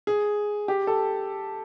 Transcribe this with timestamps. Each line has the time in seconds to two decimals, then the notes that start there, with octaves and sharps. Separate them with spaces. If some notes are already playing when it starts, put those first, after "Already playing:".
0.07 G#4
0.68 G4
0.87 A4